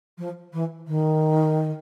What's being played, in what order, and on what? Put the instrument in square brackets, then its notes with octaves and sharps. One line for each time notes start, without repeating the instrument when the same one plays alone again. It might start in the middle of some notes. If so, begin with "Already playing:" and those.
[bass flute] F3
E3
D#3